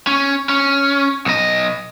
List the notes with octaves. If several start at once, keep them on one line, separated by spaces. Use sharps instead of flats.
C#4
C#4
B1 D#5